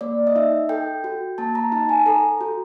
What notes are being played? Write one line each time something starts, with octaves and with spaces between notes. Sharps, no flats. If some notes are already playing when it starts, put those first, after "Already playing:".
A#3 D5
D#5
D#4 E5
A4 G5
F#4
A#3 A5
A#5
D#4 A5
G#5
A4 A#5
F#4